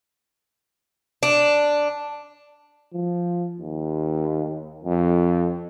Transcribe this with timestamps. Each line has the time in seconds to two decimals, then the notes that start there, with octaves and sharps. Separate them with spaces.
1.23 D4
2.94 F3
3.59 D#2
4.84 F2